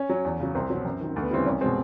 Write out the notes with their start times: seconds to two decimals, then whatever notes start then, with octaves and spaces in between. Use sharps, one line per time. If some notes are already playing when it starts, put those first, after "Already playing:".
Already playing: C#4
0.10 F#3
0.25 E2
0.40 C#3 F#3
0.55 C2 C4
0.70 B2 F#3
0.85 F#2
1.00 D#3 F#3
1.16 D2
1.22 B3
1.31 C#3 E3 G3 C4
1.46 C2 C#4
1.61 B2 G#3 C4